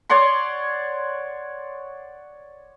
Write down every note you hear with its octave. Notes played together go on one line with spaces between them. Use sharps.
C#5 D5 F#5 C6